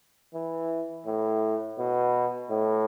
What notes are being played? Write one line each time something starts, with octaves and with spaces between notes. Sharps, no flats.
E3
A2
B2
A2